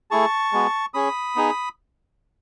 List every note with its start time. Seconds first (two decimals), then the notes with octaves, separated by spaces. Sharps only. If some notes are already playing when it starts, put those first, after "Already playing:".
0.11 A3 E4 G#4 A5 C#6
0.52 G#3 B3 F#4
0.94 C#4 G#4 B5 D#6
1.36 B3 D#4 G#4